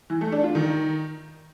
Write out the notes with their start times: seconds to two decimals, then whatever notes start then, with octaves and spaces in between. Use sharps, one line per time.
0.10 E3
0.21 A3
0.32 D4
0.44 F4
0.55 D#3